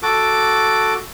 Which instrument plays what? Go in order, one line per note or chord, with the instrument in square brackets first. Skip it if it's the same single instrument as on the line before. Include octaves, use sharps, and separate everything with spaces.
[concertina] F#4 A4 D6